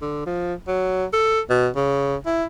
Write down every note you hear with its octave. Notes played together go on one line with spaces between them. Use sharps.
D3
F3
F#3
A4
B2
C#3
E4